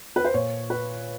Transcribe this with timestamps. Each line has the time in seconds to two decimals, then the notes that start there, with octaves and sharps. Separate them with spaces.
0.16 B4
0.25 C5
0.34 A#2 C#5
0.70 B4